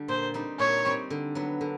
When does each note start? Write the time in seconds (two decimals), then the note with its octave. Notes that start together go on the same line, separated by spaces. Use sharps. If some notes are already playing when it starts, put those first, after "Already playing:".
Already playing: D3 G3
0.08 A#2 C5
0.34 G3 C4 D#4
0.59 A#2 C#5
0.85 G3 C4 D#4
1.10 D3
1.35 F#3 B3
1.61 D3